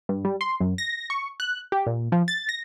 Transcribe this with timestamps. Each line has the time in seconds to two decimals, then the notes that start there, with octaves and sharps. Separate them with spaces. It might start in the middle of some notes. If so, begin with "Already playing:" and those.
0.09 G2
0.25 G3
0.41 C6
0.60 F#2
0.78 A#6
1.10 C#6
1.40 F#6
1.72 G4
1.87 A#2
2.12 F3
2.28 A6
2.49 A#6